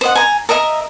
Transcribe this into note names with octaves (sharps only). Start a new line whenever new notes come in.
C5 D#5 F#5
G#5 A#5
A#4 D#5 E5 A#5